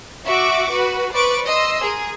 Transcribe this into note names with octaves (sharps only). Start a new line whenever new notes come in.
F#4 E5 C#6 D6
F#4 B4
B4 C5 D5 C#6 D7
D#5 C6 E6
G#4 A#4